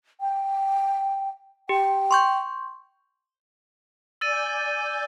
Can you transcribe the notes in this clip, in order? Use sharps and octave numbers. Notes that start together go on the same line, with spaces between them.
G5
G4 G5
C6 C#6 G6
D5 G#5 E6 G6 A6 D#7